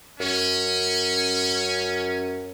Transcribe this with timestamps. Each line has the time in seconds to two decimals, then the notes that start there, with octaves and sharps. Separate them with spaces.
0.20 F#2 C#4